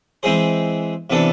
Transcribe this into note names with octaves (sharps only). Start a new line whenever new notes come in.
E3 G#3 C4 G#4 C5
C3 E3 B3 D4 A4